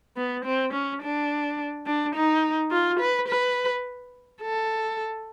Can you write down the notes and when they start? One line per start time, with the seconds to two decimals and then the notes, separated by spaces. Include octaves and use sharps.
0.17 B3
0.45 C4
0.73 C#4
1.02 D4
1.86 D4
2.15 D#4
2.71 F4
3.00 B4
3.28 B4
4.42 A4